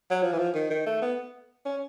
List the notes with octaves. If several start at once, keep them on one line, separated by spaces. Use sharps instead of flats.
F#3
F3
E3
F3
D#3
D#3
A3
B3
C#4